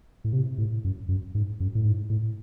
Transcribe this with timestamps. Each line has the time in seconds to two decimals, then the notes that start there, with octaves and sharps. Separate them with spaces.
0.24 A2
0.33 C3
0.58 A2
0.84 F#2
1.09 F#2
1.35 G#2
1.60 F#2
1.75 A2
1.85 G#2
2.10 A2